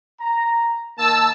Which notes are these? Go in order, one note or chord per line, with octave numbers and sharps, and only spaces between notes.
A#5
D#3 A#3 A5 E6